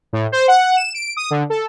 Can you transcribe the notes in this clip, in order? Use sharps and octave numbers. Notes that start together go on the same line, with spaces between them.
A2
C5
F#5
E7
D7
D#6
D3
A4